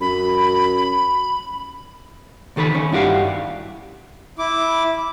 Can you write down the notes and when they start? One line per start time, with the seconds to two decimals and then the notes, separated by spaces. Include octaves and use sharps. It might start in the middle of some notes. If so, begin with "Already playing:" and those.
0.01 F#2 B5
2.56 C#2 D#3 A4 B4 B5
2.72 D#3 C#4
2.92 G2 E4 F#4 G4 A#4 F5
4.39 E4 D6